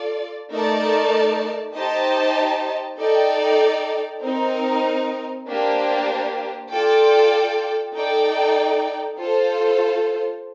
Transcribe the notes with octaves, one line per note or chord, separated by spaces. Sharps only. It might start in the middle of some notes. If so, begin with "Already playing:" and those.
Already playing: F4 A4 D5
A3 D#4 A#4 D5 A5
D#4 G4 C5 D#5 A5
D#4 A4 D5 G5
C4 D#4 A#4
A#3 D4 G4 C5
F4 A4 D5 G5
D#4 A4 D5 G5
F4 A4 C5